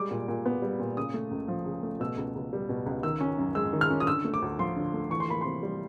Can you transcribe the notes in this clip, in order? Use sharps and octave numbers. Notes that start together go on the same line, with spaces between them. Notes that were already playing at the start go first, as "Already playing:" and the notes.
Already playing: G3 G#3 D6
A#2
A#2
B3
G3
A#2
C#3 D#6
A3
C#2
F3
C#3
A3
B2 E6
C#2
C#2
G3
B2
C#2
D#3 E6
C#4
F#2
G#3 E6
D#3
F6
C#4
D#6
D3 E6
A3
D6
D2
F3 C6
D3
A3
E3 C#6
C6
A#3 B5
C3 C6
G3